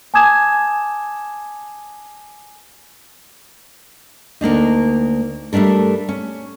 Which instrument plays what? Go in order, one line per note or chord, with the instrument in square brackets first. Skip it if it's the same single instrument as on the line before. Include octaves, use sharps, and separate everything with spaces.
[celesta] G#5 A5 D6 D#6 G#6 E7
[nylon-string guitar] D2 A#3 D4 D#4
G3 A3 C#4 D4 A#4
C#4